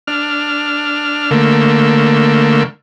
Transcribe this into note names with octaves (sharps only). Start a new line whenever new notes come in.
D4 F6
D3 A3 A#3